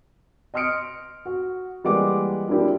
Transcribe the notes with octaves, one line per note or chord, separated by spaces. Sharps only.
D#5 C6 D#6 F6 C#7 D7
F#4
E3 G3 G#3 A#3 F#5 D6
F3 F#3 A#3 D4 E4 G4